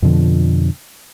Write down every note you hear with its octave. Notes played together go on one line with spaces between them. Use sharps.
F2 B2 D3 F3